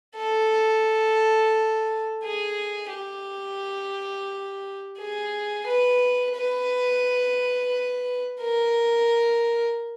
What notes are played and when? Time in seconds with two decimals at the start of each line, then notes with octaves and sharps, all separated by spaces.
0.17 A4
2.24 G#4
2.92 G4
4.99 G#4
5.66 B4
6.36 B4
8.42 A#4